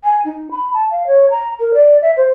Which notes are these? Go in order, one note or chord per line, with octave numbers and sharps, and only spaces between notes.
G#5
D#4
B5
A5
F5
C#5
A#5
A#4
D5
E5
C5